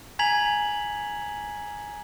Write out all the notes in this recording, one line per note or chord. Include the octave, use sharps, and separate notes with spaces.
G#5 A#5 G#6 B6 F7 F#7